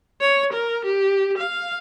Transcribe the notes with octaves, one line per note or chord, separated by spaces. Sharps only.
C#5
A#4
G4
F5